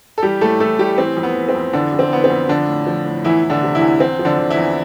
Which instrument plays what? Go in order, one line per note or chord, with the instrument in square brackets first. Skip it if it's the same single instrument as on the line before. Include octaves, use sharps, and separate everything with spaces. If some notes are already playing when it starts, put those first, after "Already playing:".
[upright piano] A4
E3 G3 G4
A2 A3 A4
E3 A3 A4
A2 G3 G4
E3 C4
F2
B3
E3
C4
F2
D3 E3 D4
F2
C4
E3 B3
C4
F2
D3 F3 D4
A2
F3
A2
E2 E3 E4
E3
D3 D4
C3
E3 E4
E2
E2 C4
F3
D3 D4
D3
E3 E4
E2